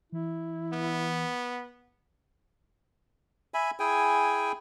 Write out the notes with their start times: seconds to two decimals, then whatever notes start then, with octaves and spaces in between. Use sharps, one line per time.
0.12 E3 E4
0.73 B3
3.54 E5 G#5 B5
3.80 E4 G#4 G5 G#5